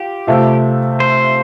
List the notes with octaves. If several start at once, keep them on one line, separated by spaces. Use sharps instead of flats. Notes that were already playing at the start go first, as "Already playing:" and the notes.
Already playing: F4 G4
C3 A3 C4 F4
C5